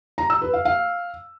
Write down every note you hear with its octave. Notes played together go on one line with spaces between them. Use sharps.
A#5
E6
B4
F5
F5